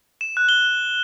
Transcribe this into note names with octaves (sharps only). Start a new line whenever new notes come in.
E7
F#6
G7